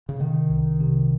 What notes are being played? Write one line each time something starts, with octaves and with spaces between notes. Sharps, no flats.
C#3
C3 D#3
C2
C3